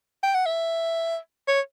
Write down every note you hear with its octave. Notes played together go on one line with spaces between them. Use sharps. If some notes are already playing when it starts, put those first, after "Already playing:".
G5
F#5
E5
C#5